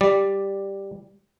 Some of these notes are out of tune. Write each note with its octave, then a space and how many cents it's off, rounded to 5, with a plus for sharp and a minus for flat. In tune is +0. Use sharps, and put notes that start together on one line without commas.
G3 +0 D5 +0